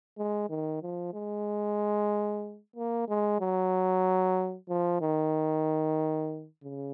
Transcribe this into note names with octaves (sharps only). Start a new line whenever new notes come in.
G#3
D#3
F3
G#3
A#3
G#3
F#3
F3
D#3
C#3